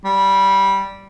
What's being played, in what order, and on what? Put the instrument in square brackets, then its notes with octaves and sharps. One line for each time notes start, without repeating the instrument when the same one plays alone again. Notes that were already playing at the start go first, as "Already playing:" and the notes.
[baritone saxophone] G3